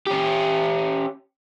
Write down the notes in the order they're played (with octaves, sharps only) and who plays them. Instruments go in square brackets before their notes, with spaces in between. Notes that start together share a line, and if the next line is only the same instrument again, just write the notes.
[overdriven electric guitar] C#4 G4